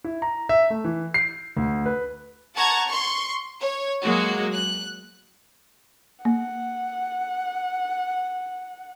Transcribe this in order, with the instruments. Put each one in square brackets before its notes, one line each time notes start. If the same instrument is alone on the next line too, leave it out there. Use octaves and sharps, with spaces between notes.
[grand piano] E4
A#5
E5
A3
E3
C7
D2
B4
[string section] F#5 A5 A#5 C#6 G#6
C6 C#6
C#5
F#3 G#3 A#3 F#4
F#6
[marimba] A#3 [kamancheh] F#5